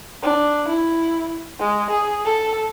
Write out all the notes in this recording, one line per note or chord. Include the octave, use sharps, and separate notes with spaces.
D4
E4
G#3
G#4
A4